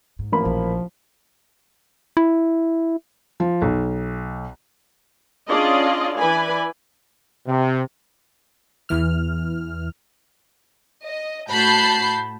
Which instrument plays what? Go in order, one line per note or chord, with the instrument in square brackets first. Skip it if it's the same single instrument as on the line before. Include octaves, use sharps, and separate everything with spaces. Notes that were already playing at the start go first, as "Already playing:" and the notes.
[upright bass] G#2
[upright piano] A1 A#3 B5 [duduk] F3
[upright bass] A#1 E3
[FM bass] E4
[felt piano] F3
B1
[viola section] C#4 D4 F4 G#4 D5 D#5
E3 B4 D5 G#5 B5
[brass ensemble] C3
[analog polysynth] E2 E3 F6
[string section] D#5
A2 F#4 A5 B5 G6 C7